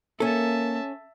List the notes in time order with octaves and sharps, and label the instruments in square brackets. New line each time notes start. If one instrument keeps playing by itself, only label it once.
[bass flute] A#3 [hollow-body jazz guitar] C#4 A4 [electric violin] E5 A5